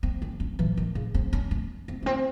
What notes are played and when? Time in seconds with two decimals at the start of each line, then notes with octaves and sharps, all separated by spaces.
0.03 C4
0.22 C#4
0.40 C#4
0.59 E3
0.77 D#3
0.95 C#3
1.14 C4
1.33 C#4
1.51 C#4
1.88 C4
2.03 A3
2.06 C4